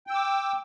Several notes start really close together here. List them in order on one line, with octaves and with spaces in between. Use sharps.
G5 E6 D6